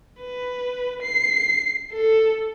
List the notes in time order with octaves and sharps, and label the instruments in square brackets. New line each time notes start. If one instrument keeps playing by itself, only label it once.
[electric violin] B4
C7
A4